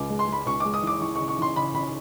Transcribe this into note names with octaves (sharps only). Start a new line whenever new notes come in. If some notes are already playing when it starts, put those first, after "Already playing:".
Already playing: C#2 D6
G#3
C6
G#3 B5
C#2 C#6
G#3 D6
D#6
E3 D6
E3 C#6
C#6
C#3
C#6
E3 C6
C#3 B5
C#3 B5